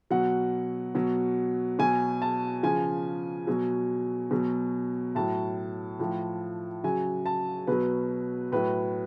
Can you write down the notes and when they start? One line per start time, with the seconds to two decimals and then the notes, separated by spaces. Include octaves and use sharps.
0.10 B2 F#3 F#5
0.95 B2 F#3
1.79 B2 F#3 G#5
2.22 A5
2.63 C#3 F3 G#5
3.47 B2 F#3
4.31 B2 F#3
5.15 A2 F#3 A5
5.99 A2 F3
6.83 C#3 F#3 G#5
7.26 A5
7.67 B2 F#3 B4
8.52 A2 F#3 B4